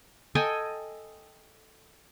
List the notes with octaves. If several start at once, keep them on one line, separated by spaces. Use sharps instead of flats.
A4 D#5 G5 G#5